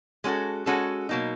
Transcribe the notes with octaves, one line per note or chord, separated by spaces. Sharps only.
G#3 C#4 F#4 A4
G#3 C#4 F#4 A4
B2 F#3 A#3 D#4